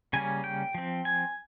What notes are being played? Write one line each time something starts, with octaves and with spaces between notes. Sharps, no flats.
C#3 G3 A#3 C#4 G#5
G5
F3 C4
G#5